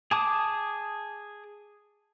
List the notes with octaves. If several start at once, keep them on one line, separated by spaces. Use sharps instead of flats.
G#4 A5 D6 D#6